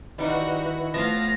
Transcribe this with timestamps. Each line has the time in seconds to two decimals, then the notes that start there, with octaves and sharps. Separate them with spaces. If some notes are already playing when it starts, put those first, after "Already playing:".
0.18 D#3 G3 D#4 E4 F#4 B4 F#5
0.94 A2 F3 B3 F5 A#6